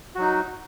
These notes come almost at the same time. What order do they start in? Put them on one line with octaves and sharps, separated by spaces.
F#4 F#3 D#4